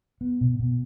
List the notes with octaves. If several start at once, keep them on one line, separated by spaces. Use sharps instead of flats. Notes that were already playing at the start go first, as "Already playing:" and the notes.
B3
B2
B2